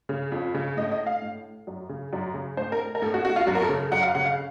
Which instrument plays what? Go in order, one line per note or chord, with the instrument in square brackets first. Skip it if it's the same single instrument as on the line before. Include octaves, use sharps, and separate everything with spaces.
[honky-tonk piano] C#3
F2
C#3
A2 D#5
D#5
F5
A2
F#2
C#3
F#2
C#3
A2 C5
A#4
A#4
A2 A4
F#4
F#4
F4
F#2 F#4
A#4
A4
C#3
F#2 F#5
F5
C#3 F#5
F5